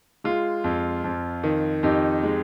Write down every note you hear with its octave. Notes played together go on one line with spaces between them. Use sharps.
G#3 F4
F2
F2
D#3
F2 D#4 G4
G#3